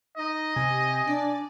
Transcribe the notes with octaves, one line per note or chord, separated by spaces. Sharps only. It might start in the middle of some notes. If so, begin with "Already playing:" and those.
D#4 D#5
C3 G#5
D4 D5